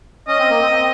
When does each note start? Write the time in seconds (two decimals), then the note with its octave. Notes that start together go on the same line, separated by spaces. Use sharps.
0.27 C#4 D#5
0.39 C4
0.49 A#3
0.61 C4
0.72 C4